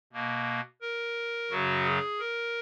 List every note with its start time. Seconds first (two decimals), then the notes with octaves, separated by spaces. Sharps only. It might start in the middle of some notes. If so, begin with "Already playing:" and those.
0.12 B2 A#3
0.82 A#4
1.50 F#2 C#3 F#3 F#4
1.84 G#4
2.20 A#4